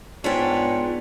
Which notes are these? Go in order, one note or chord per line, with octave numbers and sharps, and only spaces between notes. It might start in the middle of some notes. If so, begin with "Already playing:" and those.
G#2 B3 D4 F4 C#5 G5 G#5